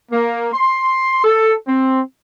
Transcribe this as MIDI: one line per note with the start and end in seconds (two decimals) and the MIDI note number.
0.12 0.48 58
0.53 1.23 84
1.24 1.53 69
1.67 2.00 60